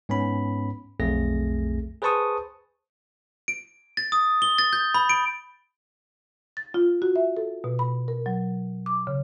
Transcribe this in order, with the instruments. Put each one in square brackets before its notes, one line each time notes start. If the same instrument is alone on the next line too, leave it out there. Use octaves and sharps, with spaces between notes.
[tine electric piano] G#2 B3 C#4 B5
B1 F2 A3 G#4 A#6
G#4 B4 C5 A5 C#6 D#6
[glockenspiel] D7
A6
D#6
G7
A6
G6
B5
D7
[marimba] A6
F4
F#4
E5
A4
B2
B5
A#4
F#3
D6
C#3